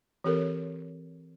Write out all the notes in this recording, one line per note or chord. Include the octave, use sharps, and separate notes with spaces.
E3 C4 G4 A4 A#4 C#5